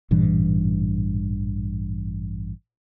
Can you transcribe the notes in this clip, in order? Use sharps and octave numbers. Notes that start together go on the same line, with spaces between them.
A1 G2 A#2 E3